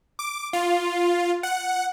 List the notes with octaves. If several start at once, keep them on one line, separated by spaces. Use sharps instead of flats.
D6
F4
F#5